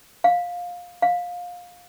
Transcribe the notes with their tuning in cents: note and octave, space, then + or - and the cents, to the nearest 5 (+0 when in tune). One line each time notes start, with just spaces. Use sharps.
F5 +15
F5 +20